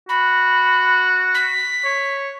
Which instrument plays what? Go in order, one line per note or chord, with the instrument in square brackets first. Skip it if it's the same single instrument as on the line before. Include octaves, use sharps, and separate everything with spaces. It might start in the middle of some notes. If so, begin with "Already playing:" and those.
[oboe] F#4 [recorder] B5
[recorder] B6
[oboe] C#5